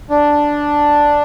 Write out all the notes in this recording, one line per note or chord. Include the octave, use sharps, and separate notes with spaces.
D4